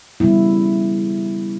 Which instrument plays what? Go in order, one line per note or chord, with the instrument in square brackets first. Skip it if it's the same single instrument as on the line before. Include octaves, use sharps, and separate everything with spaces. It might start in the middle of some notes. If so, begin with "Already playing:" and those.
[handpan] C#3 G3 B3 E4